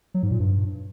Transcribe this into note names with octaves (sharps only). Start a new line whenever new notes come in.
F#3
G#2
A#2
G2